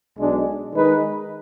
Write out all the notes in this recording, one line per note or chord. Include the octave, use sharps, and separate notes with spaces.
B1 B2 G#3 D4
D#3 G#3 D#4 G#4 B4